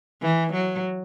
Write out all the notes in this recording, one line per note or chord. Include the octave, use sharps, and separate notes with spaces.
E3
F#3